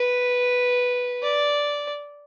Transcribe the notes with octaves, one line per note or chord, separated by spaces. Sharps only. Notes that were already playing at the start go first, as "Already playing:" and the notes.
Already playing: B4
D5